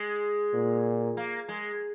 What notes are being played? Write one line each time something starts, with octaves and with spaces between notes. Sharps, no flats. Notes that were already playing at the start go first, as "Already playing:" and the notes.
Already playing: G#3
A#2
A#3
G#3